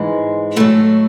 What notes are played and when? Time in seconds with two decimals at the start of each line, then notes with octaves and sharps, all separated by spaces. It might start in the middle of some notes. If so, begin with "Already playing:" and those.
Already playing: G#2 E3 G#3
0.56 A2 F#3 A3